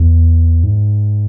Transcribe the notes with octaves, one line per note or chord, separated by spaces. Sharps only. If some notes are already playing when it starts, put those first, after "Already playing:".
Already playing: E2
G#2